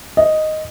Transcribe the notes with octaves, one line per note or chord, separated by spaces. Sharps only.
D#5